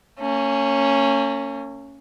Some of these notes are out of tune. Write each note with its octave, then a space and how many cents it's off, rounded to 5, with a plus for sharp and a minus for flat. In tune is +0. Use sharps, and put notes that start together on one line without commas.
A#3 -40 C#4 +0